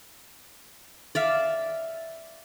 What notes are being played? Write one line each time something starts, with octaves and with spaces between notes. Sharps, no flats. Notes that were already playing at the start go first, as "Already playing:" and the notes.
D5 E5 F5